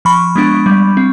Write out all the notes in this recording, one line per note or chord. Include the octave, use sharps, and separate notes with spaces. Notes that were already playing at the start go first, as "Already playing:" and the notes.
F3 B5 C#6
G#3 B3 D4
G3
C4